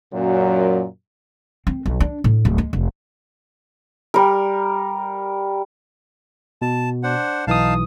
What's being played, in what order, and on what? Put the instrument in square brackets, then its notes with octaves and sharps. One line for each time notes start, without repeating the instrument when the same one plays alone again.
[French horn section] F#2 A#2 F#3
[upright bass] C4
B1
D4
A2
D1
G#3
F1
[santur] G3 A#4
[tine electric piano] B2 [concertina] A5
[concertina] D4 C5 F#5
[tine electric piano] B1 E3 D#6 [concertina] D#4 F5 A5